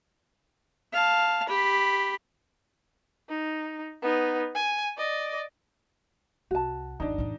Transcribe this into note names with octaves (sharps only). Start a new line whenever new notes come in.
F5 A5
G4 B5
D#4
B3 D#4
G#5
D5 D#5
C2 F#4 A5
G1 D#2 D4 D#4
E2 A2